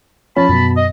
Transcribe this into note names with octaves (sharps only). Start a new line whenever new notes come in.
F3 C#4 A5 B5
F#2 B2
D#5